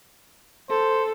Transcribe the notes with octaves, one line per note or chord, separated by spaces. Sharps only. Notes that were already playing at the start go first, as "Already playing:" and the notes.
A4 C5